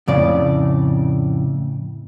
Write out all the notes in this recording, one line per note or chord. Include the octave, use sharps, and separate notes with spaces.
F2 A2 C#3 D5